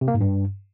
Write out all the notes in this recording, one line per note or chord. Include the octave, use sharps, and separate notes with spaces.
C3
A#3
G#2
G2